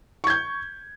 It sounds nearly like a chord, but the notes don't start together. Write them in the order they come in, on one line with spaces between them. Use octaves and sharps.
C#6 G#6 G6